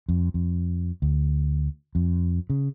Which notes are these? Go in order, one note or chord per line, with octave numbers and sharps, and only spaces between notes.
F2
F2
D2
F2
C#3